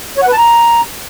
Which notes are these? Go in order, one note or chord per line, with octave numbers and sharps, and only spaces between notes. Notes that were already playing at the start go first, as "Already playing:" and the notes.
C#5
F#5
B4
A5
A#5